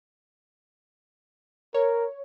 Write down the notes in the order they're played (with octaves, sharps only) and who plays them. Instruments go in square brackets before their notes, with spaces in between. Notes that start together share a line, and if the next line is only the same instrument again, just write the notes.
[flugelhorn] A#4 [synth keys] C#5